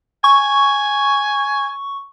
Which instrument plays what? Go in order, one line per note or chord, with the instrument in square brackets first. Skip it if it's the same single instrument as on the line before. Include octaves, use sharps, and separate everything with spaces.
[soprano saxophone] G#5 [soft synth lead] C#6